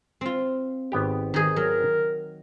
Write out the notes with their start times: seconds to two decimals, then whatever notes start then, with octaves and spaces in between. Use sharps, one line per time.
0.21 C4 F4
0.92 G#1 B3 G4
1.34 D#3 G#4
1.56 F#3 A#4